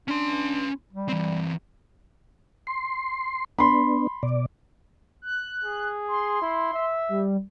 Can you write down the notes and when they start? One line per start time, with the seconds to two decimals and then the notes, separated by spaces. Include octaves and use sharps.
0.08 C#4 D4 C6
0.93 G3
1.09 E3 C4
2.67 C6
3.59 B3 D4 B5 C6
4.23 B2 D5
5.22 F#6
5.64 G#4
6.08 C6
6.41 E4
6.73 E5
7.09 G3